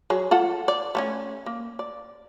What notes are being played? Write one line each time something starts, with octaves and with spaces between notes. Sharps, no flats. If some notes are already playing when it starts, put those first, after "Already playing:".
F#3 G#4
F4 A4 F#5
D5
A3 B3 C#4
A#3
D5